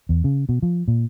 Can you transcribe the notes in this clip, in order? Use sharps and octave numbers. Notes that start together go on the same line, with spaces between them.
E2
C#3
B2
F3
A#2